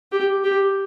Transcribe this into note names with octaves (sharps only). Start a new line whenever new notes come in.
G4
G4